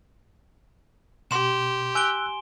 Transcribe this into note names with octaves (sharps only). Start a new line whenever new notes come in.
B2 G4 C6 E7
G#5 E6 F#6 D7 G7